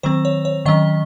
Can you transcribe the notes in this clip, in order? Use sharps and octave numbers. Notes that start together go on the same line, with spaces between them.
D#3 F#3 C4 C5
C#5
C#5
D#3 F#3 C#4 D#5